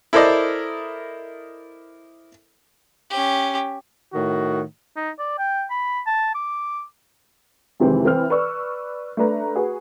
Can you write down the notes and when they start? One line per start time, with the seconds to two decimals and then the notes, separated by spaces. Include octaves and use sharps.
0.13 E4 A4 A#4 C5 D5 D#5
3.10 C#4 G4
4.14 A2 D#3 F#4
4.96 D#4
5.19 D5
5.38 G5
5.71 B5
6.07 A5
6.35 D6
7.80 F2 C3 D#3 E3 G#3 C4
8.05 E3 C4 F6
8.30 B4 D5 C#6 E6
9.17 A3 D4 B4 A#5
9.55 F#4 G#4 B4